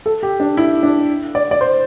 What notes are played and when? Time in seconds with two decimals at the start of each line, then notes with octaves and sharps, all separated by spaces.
0.06 A4
0.23 G4
0.40 D4
0.57 E4
0.83 D4
1.35 D5
1.51 D5
1.61 C5